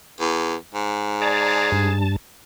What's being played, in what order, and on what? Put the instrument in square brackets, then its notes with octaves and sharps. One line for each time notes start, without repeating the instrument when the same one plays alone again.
[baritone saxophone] E2
G#2
[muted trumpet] G#4 [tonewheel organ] D5 A5 A#5
[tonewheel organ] G2 A5